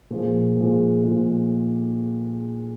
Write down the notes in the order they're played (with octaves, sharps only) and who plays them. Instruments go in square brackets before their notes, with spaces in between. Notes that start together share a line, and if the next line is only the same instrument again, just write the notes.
[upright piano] A#2 F3 G#3
A#2 F3 G#3
A#2 F3 G#3